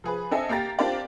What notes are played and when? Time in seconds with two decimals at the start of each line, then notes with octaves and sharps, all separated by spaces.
0.04 F3 G#4 B4
0.31 C4 D4 A4 D#5 E5 G#5
0.49 A#3 G4 A#5 A6
0.79 C4 D4 F4 G4 A#4 D5